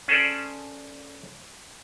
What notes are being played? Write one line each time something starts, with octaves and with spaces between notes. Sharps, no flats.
C#4 G#4 A4 C5 D5